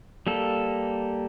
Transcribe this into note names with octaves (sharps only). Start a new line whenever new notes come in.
G3 A#3 A4